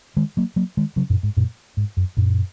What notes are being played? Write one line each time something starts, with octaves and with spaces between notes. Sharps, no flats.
D#3 G#3
F#3 A#3
F#3 A#3
D#3 G#3
C#3 F#3
F#2 A#2
G#2
F#2 A#2
G#2
F#2
F#2 A#2